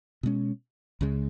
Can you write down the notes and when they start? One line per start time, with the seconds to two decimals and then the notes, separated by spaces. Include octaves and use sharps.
0.23 B2 G#3 C#4
1.01 C#2 C#3 G#3